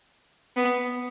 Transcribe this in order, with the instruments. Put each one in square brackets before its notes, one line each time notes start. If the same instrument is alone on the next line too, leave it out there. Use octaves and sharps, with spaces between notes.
[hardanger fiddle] B3